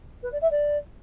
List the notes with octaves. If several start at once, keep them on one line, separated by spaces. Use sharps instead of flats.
B4
D5
E5
D5